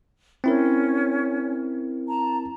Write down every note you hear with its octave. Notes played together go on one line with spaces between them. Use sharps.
C4 C#4 E4 A#4
A5 A#5